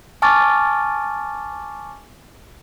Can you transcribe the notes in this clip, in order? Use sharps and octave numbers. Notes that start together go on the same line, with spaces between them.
G#5 A5 C#6 D6 F6 A6